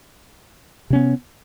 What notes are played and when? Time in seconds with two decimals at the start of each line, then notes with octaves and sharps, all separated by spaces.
0.90 C3
0.93 C#4
0.96 B3